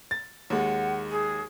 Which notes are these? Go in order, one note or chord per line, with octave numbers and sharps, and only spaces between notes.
A6
D#2 G#3 F#5
G#4